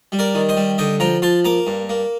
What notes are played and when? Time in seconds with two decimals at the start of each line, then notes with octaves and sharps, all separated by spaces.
0.12 G3
0.19 A#4 D5
0.35 D#3
0.49 C5 D#5
0.57 G3
0.78 D3 D#5 G5
1.00 F3 G5 A#5
1.22 F3 A5 C6
1.45 A#3 A#5 D6
1.67 G2
1.89 A#3